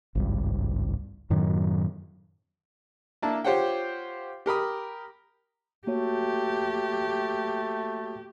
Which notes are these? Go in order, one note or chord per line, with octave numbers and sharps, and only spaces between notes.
G#1 C#2 G2
F#2 A2 D#3 F#3
A#3 D4 E4 A5
F4 G4 C5 C#5 F#5 G5
G4 A#4 B5 D#6
A3 A#3 F#4 G4 C#5